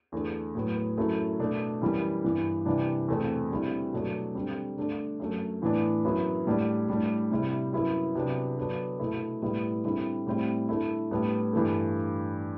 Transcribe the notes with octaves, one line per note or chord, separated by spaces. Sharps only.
E2 D3 A3
A2 F#3 B3
F#2 F#3 A3 E4
B2 A3 D4
F#2 E3 G3
G2 E3 B3
C3 E3 G3 D4
E2 B2 A3 C4
D3 G3 C4 E4
B2 F#3 A3 D4
D3 G3 C4
D3 A3 D4
F#2 F#3 A3
A2 E3 B3 D4
F#2 F#3 B3 E4
A2 G3 D4
A2 G3 D4
C3 G3 C4 E4
F#2 F#3 B3 E4
C3 F#3 B3 D4
D3 F#3 B3 D4
B2 A3 E4
A2 G3 B3 E4
D3 G3 C4 E4
A2 G3 C4 E4
D3 A3 E4
A2 G3 B3 D4
G2 E3 A3